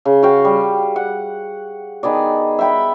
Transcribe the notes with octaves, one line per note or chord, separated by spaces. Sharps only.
C#3
F#4 F5 G5
G3
F#5
D#3 B3 G#4 D5
E5 F#5 G5 B5